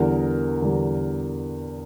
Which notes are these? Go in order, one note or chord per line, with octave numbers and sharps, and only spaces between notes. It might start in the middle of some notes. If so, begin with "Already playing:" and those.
Already playing: E2 D3 G3 A#4
E2 D3 G3